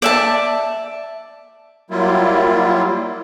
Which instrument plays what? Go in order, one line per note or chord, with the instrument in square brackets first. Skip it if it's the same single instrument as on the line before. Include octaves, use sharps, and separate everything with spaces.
[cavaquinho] D5 E5 A5
[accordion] F#3 G3 A#3 E4 F4